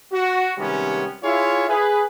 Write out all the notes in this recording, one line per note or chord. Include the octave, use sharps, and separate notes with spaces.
F#4
C3 D#3 G3 G#3 B3 C#4
E4 F4 G#4 C#5 E5 F5
G#4 B4